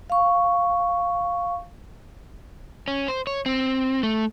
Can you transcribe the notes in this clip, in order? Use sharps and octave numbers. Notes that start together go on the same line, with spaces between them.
F5 C#6
C#4
C5
C#5
C4
A3